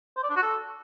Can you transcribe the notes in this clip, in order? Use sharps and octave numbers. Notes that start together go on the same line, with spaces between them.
C5
D5
D4
F#4
A4